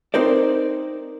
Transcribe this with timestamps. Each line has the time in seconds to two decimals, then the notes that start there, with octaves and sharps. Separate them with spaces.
0.14 C4 D#4 A#4 C5 D5